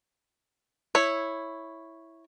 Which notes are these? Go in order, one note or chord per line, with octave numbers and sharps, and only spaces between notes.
E4 C#5